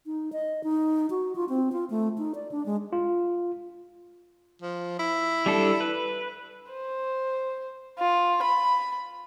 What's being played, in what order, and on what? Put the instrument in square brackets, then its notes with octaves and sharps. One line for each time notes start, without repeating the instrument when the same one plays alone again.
[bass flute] D#4
D#5
D#4
F#4
F4
C4
F4
A3
D#4
D5
D4
G#3
[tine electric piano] F4
[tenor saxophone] F3
E4
[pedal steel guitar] G3 D4 A4
B4
[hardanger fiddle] C5
F4
B5